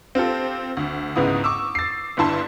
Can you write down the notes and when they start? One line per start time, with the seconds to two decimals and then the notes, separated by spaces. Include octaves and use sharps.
0.15 C4 F4 G4 A4
0.77 D2
1.16 C#2 G#2 B3 E4 D#6
1.44 C#6 D6 E6
1.75 A6 C7
2.17 G1 G2 E4 A5 C6